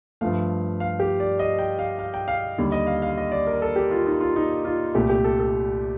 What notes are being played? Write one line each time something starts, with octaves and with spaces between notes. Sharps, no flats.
G2 F3 A3 F5
F5
G4
D5
D#5
G5
F5
F5
G5
F5
D#2 D3 G3
D#5
F5
F5
D#5
D5
A#4
A4
G4
F4
D#4
F4
D#4
F4
C2 A#2 A3 G4
G4
A4
A4